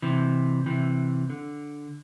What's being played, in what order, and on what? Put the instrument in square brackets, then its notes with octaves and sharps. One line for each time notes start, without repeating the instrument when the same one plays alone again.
[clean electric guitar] C3 E3
C3 E3
D3